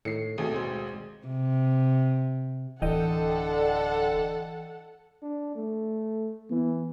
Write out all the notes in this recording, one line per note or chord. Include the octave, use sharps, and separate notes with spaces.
A2 D#3 C7 C#7
G#1 D#2 B2 A3 G4 G#4
G#3 C5
C3
D1 D3 E3 A4 D#5 F#5 G5
D4
A3
E3 B3